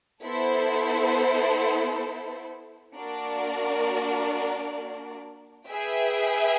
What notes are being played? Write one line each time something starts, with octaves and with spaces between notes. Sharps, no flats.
B3 E4 A4 C5
A#3 D4 F#4 A#4 D5
G#4 B4 E5 G5